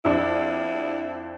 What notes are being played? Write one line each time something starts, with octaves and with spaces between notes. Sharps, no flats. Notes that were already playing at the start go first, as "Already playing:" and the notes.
F2 F3 D4 E4